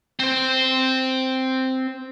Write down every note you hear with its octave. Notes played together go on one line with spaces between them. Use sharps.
C4 C5